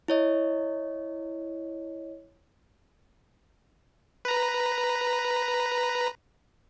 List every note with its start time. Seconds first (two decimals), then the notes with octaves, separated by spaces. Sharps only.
0.08 E4 C#5 D#5
4.25 B4 A#5